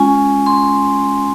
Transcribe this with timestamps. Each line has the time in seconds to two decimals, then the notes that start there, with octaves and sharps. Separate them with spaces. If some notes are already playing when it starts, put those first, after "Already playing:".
Already playing: G#3 C#4 F4 G#5
0.46 C6